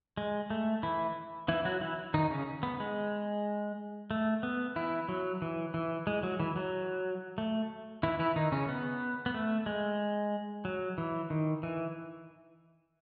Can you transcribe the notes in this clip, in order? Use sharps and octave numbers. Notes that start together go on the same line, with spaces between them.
G#3
A3
E3 E4
E3 E4
F#3 F#4
E3 E4
D#3 D#4
C#3 C#4
B3
G#3
A3
B3
E3 E4
F#3
E3
E3
G#3
F#3
E3
F#3
A3
E3 E4
E3 E4
D#3 D#4
C#3 C#4
B3
B3
A3
G#3
F#3
E3
D#3
E3